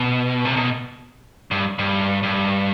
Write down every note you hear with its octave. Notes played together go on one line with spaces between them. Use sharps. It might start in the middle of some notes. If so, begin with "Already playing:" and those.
Already playing: B2
C3
B2
G2
G2
G2